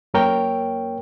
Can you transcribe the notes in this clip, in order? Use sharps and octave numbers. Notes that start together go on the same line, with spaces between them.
F#2 A#3 A#4 C#5 G5